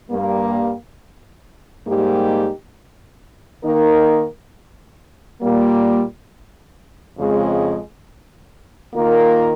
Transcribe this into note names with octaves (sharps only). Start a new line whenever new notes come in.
G2 G3 A#3
G#2 G3 A#3 D#4 G4
D#3 A#3 D#4 A#4
A#2 G3 A#3
F2 C#3 F3 G#3 C4
D#3 A#3 F4 A#4